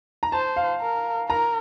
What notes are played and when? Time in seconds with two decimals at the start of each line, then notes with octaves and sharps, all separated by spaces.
0.23 A#5
0.32 C5 A5
0.56 F5
0.81 A#4
1.29 A#4 A#5